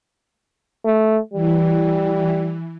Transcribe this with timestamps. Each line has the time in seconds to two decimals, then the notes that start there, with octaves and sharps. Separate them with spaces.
0.85 A3
1.33 E3 G3